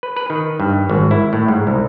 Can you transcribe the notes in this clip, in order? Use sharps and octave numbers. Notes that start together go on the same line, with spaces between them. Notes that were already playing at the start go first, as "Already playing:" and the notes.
B4
B4
D#3
G2
G#1
E4
A2
G#2
C2